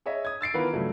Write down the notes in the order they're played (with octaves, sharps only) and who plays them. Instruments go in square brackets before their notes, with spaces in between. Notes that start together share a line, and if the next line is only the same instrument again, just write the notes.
[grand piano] G#4 C#5 D#5 E5
D#6 G#6
E6 A6 C7 D7
D#3 E3 B3 F4 A#4 B4
G2 C#3 F3 F#3 A3